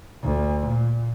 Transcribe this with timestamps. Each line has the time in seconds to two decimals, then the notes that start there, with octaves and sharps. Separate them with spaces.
0.23 D2
0.67 A#2